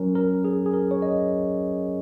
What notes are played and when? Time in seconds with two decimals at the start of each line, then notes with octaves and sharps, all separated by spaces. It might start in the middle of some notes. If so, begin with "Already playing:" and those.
Already playing: F#3 C#4 A#4
0.15 A#4
0.45 G#4
0.66 G#4
0.74 A#4
0.91 C#5
1.02 D#5